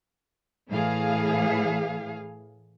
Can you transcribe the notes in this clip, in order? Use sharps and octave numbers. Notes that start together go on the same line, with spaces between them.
A2 E3 G#4 F5